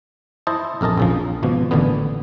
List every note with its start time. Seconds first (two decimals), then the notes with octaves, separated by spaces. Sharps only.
0.47 E4 C5 D#5 A5
0.81 A#1 F2 A#4 D#5 A5
0.97 A#1 C#3 F3
1.43 G#1 B2 F3
1.71 A1 A#2 D3 B3